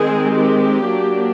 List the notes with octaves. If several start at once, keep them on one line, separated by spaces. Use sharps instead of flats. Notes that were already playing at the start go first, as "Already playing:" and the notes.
Already playing: D#3 G#3 C4 G#4
G4
F#3 A#3 D4